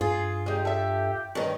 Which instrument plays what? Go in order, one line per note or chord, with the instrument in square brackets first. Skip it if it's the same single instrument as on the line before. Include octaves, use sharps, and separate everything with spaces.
[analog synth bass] G2 [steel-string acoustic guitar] F4 [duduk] G#4
[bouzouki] G#3 D#4 [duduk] G4
[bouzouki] A4 E5
[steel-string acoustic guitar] G2 D#3 [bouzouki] C#4 D#4